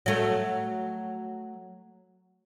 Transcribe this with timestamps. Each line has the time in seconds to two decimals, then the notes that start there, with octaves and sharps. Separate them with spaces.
0.06 F#3 A3